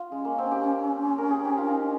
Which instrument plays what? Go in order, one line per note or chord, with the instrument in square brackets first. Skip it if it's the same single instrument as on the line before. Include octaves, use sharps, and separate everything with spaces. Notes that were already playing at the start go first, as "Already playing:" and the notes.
Already playing: [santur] F4
[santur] G#3 [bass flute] C#4
[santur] A#3
C4
G4
A#4
G#4
G4
F4
D#4